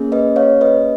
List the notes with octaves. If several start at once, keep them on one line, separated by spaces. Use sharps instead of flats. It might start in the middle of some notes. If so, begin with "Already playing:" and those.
Already playing: A#3 C#4 G#4
B4 D#5
C#5 F5
B4 D#5